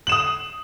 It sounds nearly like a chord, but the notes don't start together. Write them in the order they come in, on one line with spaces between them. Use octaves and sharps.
F#7 E7 D#6